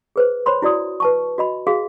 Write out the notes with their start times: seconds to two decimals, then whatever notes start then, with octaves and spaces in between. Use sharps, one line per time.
0.16 G#4 B4 C5
0.46 C5 C#5 B5 C6
0.62 E4 F#4 D5 D#6
1.00 B4 A5 C#6
1.38 F#4 D#5 B5
1.67 F#4 G#4 F5